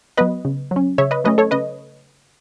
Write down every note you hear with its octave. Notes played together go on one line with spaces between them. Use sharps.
F#3 B3 B4 D#5
C#3
F#3 C#4
C#3 C#5 E5
B4 D#5
F#3 A3 C#4 B4 D#5
A4 C#5
C#3 B4 D#5